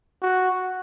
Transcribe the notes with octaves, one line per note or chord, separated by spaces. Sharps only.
F#4